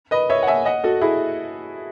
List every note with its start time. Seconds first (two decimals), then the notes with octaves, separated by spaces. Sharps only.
0.11 B4 D#5
0.30 C#5 E5
0.43 F#5
0.47 E5 G#5
0.65 D#5 F#5
0.84 F#4 A4
1.01 E4 G#4